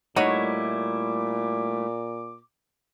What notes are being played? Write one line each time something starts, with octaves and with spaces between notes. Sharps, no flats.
A#2 G3 A3 D#4 E4 F#4 C#5 D6